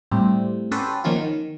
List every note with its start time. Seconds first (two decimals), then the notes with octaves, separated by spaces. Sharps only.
0.11 A2 G3 A3 C4
0.71 C#4 F#4 G4 A4 B4 C5
1.04 D#3 F3 A#3 C#4 F4 F#4
1.16 D#3